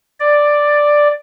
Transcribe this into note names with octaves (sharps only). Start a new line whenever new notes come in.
D5